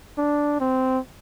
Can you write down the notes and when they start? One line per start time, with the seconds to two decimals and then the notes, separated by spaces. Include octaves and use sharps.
0.18 D4
0.60 C4